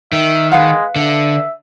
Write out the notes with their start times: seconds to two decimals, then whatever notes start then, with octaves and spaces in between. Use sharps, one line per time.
0.12 D#3 E5
0.52 G#3 B4 F5 F#5
0.96 D3 E5